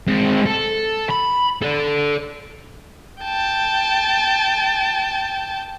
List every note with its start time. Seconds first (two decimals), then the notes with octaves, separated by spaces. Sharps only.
0.08 G#3 C4
0.46 A4
1.10 B5
1.62 A4 D5
3.22 G5 A5